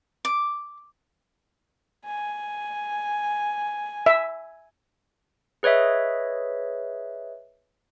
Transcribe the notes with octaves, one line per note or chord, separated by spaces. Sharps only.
D6
G#5
E5
G#4 B4 C#5 D#5 E5